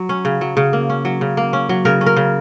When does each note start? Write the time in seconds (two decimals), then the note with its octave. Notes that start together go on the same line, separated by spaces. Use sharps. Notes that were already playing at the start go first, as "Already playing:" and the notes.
Already playing: F#3
0.09 C#4
0.25 C#3
0.41 F#3
0.57 C#3
0.73 A#3
0.90 C#4
1.05 F#3
1.21 C#3
1.37 A#3
1.53 C#4
1.69 F#3
1.85 C#3 A#4
2.01 C#4
2.06 A#4
2.16 C#3